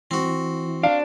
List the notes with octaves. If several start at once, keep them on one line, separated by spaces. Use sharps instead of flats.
E3 C4 F#4
D4 F5